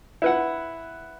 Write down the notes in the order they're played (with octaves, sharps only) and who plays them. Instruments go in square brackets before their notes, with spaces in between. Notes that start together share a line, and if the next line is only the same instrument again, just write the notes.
[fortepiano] E4 B4 F#5